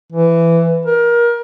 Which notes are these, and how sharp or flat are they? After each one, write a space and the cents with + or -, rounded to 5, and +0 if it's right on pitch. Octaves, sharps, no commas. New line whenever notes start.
E3 +15
A#4 +25